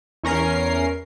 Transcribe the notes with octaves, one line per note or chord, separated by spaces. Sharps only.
E2 C#4 A#4 C7